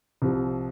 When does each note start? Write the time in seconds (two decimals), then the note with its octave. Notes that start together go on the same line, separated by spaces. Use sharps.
0.22 C2 C3 F3